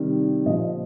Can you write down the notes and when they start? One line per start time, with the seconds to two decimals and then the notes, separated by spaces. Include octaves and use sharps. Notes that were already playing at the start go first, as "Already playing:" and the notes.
Already playing: C3 D#3 G3
0.46 A#2 F3 D#5